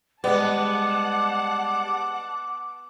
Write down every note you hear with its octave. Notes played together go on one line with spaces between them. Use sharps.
G3 G#3 B3 F#5 A5 D6